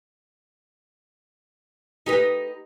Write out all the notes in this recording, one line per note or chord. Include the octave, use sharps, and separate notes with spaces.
D#4 G4 B4